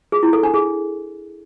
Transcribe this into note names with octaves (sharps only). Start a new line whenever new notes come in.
G#4
E4
A4
D4
G#4